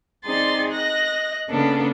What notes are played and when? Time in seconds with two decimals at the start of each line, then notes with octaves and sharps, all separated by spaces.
0.25 C4 D#4 G#4 D5 C6 A6
0.69 D#5 F#6 A#6
1.50 C#3 A#3 B3 C#4 D4 A4